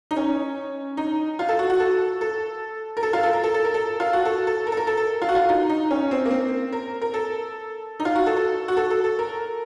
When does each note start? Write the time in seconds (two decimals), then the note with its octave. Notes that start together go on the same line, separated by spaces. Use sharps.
0.11 D#4
0.17 C#4
0.97 D#4
1.39 F4
1.49 A4
1.59 F#4
1.70 F#4
1.80 A4
2.21 A4
2.97 A#4
3.03 A4
3.13 F4
3.23 A4
3.33 A#4
3.44 A4
3.54 A4
3.65 A#4
3.74 A4
4.00 F4
4.13 F#4
4.25 A4
4.47 A4
4.67 A#4
4.72 A4
4.77 A#4
4.87 A4
4.97 A4
5.22 F4
5.29 F#4
5.35 F4
5.49 D#4
5.69 D#4
5.91 C#4
6.11 C4
6.26 A#3
6.30 C4
6.72 A#4
7.02 A#4
7.14 A4
8.00 D#4
8.05 F4
8.16 F#4
8.26 A4
8.36 A4
8.68 F#4
8.77 A4
8.90 A4
9.04 A4
9.19 A#4